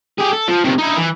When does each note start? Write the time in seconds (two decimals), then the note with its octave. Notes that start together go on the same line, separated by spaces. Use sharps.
0.19 G4 G#4
0.33 A4
0.48 F3
0.64 C3 D#3
0.79 D#4 E4
0.97 E3